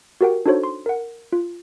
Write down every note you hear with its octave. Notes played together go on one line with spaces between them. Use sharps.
F#4 G4 A#4 F#5 G5
D4 D#4 F#4 A4 C5 C#5
C6
A#4 F#5
F4